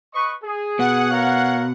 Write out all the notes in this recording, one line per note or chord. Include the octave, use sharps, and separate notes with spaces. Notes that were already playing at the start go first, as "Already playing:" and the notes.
B4 D#5 C#6
G#4
B2 F#5
A#4 C#5 F5